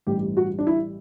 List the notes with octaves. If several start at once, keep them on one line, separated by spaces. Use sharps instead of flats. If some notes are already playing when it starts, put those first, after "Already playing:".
A1 G2 E3 G3 G4
F#4
D4
E4